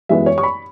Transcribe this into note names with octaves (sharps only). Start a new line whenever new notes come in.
F#2 E3 G#3 B3 E5
C#5
C#6
B5